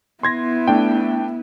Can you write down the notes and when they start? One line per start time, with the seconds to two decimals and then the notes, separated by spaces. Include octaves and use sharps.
0.23 B3 E4 C6 G#6 A#6
0.68 A3 D4 G5